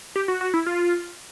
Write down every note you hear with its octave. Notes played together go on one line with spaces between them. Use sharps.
G4
F#4
F#4
E4
F4